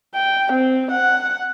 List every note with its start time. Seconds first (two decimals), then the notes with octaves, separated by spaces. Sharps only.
0.15 G5
0.52 C4
0.91 F#5